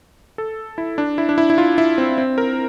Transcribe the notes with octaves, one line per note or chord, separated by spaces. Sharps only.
A4
E4
D4
E4
D4
E4
E4
F4
E4
C4
C4
A#4